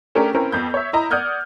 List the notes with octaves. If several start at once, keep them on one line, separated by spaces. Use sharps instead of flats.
A3 C#4 D4 G4 G#4 A#4
C4 C#4 E4 A#4
F2 B3 G6
C#5 E5
E4 D#5 A#5
D5 F#5 D#6 F6 G6 G#6